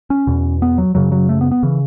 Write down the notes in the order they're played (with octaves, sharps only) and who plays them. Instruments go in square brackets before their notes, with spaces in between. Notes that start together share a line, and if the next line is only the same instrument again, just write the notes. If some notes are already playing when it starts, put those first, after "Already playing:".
[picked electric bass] C#4
E2 B2
B3
F#3
F#2 C#3 F#3
F#3
A3
B3
B3
C#3 E3